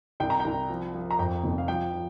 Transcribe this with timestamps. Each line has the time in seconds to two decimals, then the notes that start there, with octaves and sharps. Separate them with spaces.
0.20 C2 G5
0.30 A#5
0.40 G5
0.45 C2
0.69 F3
0.94 F3
1.11 A#5
1.18 F2 G5
1.44 F1
1.58 F5
1.68 F3 G5
1.93 F3